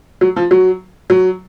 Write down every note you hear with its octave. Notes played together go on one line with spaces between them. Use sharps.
F#3
F3
F#3
F#3